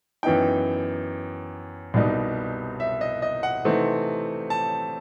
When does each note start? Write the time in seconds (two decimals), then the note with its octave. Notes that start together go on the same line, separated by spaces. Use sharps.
0.23 F#2 E3 B3 D#4 G5
1.94 C2 B2 G3 D#4
2.80 E5
3.01 D#5
3.22 D#5
3.43 F#5
3.65 C3 E3 A3 C4 D#4
4.50 A5